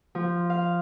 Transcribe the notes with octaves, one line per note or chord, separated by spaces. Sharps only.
F3
F5